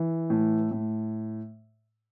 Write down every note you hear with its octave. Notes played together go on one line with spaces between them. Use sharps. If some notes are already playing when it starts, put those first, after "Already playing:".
Already playing: E3
A2
A2